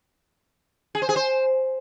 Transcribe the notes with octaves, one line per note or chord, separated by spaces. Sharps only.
G#4
C5
G#4
C5